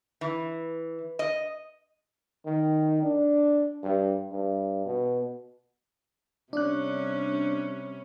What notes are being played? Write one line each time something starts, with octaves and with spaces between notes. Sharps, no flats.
E3
D#5
D#3
D4
G2
G2
B2
C3 G3 C#4 D4 F#6